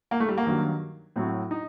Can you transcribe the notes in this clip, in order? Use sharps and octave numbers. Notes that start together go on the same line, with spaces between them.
A#3
A3
G3
A#3
G2 D#3 F#3
A2 F#3 C4
D#4